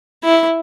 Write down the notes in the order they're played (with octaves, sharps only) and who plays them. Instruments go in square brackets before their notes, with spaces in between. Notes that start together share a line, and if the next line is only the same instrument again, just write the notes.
[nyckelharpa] E4